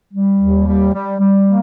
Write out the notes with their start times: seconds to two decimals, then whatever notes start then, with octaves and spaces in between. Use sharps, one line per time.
0.13 G3
0.40 D#2
0.67 G3
0.94 G3
1.20 G3
1.47 A#3